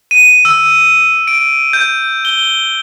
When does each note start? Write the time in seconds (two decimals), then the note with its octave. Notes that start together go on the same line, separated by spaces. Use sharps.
0.11 D#7
0.45 E6
1.27 D7
1.73 G6
2.25 G7